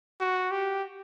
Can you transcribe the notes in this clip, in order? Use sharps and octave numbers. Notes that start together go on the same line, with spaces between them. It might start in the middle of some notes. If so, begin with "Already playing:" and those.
F#4
G4